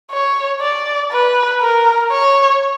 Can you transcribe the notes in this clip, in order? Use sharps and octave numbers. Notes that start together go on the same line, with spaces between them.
C#5
D5
B4
A#4
C#5